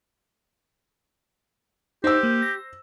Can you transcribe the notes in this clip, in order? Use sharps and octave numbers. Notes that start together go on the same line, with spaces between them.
D#4 G4 C5 E6
A#3
A#6